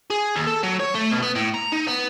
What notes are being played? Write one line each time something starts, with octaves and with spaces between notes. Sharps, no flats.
G#4
D#2
A4
F#3
C#5
A3
B2
B3
A2
A#5
D#4
B3